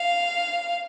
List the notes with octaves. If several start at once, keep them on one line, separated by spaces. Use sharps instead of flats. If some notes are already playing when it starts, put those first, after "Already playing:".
Already playing: F5